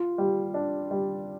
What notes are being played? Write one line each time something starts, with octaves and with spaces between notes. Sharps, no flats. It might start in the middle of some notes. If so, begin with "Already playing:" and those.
Already playing: F4
G3
D4
G3